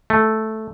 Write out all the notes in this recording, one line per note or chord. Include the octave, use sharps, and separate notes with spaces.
A3